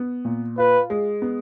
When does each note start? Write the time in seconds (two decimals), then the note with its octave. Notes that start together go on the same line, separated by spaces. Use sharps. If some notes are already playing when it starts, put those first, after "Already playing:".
Already playing: B3
0.25 A#2
0.58 F4 B4
0.90 G#3
1.22 B3